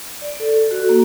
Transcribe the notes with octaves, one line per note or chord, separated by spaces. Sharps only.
D5
A4
F#4
A#3